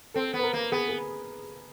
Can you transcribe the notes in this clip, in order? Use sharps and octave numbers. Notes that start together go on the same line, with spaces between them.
C4 A4
B3
B4
A#4
A#3
B3 G#4
G#4